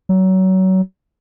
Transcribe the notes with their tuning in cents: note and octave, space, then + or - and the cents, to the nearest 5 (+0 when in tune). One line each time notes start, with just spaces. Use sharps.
F#3 +25